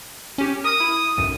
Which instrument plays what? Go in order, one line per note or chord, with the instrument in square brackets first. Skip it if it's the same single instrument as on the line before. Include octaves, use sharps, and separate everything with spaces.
[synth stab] C#4 G4
[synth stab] A#4 [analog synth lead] D#6
[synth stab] E4
B1 F#2